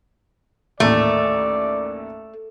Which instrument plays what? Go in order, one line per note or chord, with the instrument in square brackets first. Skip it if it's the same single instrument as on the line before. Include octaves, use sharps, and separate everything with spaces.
[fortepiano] A1 D#2 A#2 [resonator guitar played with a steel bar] A3 [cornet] D5